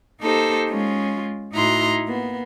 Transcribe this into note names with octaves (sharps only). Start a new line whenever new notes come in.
A#3 D#4 G4 A4 C5
G#3 C#4 F4
A2 D#4 E4 F#4 A#5 C6
A#3 B3